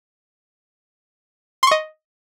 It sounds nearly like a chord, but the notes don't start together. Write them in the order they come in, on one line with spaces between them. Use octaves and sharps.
C6 C#6 D#5